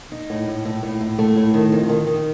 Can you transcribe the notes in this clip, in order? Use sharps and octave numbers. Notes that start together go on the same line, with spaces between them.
D#4
A2
A2
A2
A2
A2
A3
A2
D#3
F2
D#3
D#3